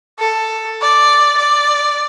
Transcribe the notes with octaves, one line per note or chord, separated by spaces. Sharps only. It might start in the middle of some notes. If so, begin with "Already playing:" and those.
A4
D5
D5